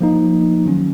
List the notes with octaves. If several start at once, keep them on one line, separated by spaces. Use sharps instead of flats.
F3 A#3 D#4
D#3 F#3 C#4